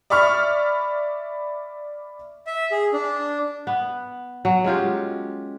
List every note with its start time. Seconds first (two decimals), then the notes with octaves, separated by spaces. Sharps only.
0.10 D5 E5 B5 C#6 F6
2.47 E5
2.71 G#4
2.93 D4
3.67 B3
4.45 F#3
4.64 G#3 C#4 F4 G4